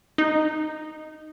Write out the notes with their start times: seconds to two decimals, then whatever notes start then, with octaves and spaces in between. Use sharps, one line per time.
0.18 D#4